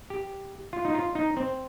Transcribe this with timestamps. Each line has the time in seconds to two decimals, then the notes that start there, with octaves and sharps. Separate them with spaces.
0.10 G4
0.73 F4
0.85 D#4
0.94 F4
1.15 D#4
1.37 C4